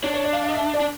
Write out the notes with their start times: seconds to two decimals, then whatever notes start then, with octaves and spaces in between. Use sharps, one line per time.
0.03 D4 C#5
0.14 C#5
0.24 D5
0.33 F5
0.44 F5
0.49 D#5
0.54 E5
0.74 D5
0.80 D4